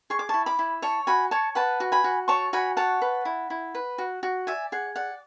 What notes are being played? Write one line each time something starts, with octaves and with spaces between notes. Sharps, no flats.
G#4 C#6
D6
E4 A5 C#6
B5 D6
E4
C#5 A5 C#6
F#4 G#5 B5
C#5 A5 C#6
B4 F#5 A5
F#4
G#5 B5
F#4
C#5 A5 C#6
F#4 G#5 B5
C#5 F#5 A5
B4
E4
E4
B4
F#4
F#4
D5 E5 G#5
G#4 F#5
D5 F#5